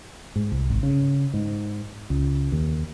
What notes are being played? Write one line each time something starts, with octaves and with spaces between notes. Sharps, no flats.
G#2
C2
G#1
C#3
G#2
C#2
D#2